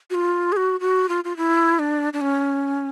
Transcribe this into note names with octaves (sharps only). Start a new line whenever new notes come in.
F#4
F4
G#4
F#4
F#4
F4
F4
E4
D4
D4
C#4